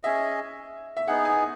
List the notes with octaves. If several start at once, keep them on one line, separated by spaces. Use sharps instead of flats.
C#4 G#4 D#5 E5
E5
B3 D#4 G#4 F#5
G#5